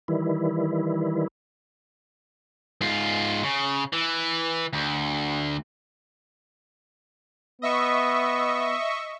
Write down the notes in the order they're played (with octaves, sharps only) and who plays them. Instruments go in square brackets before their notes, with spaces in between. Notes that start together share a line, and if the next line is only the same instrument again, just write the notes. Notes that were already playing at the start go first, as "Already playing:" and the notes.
[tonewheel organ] D#3 E3 G3 E4
[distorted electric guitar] G#2 F4
C#3
E3
D2
[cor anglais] B3 [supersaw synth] D#5 E5 C#6